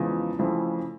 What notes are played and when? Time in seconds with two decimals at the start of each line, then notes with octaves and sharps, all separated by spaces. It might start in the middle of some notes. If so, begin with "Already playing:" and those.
Already playing: E2 C#3 F3 G#3
0.39 F2 C#3 E3 A3